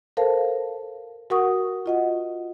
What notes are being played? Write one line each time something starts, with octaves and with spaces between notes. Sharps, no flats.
A4 A#4 C5 F5 A5
F#4 A#4 F#5 C#6 D#6
F4 D#5 F#5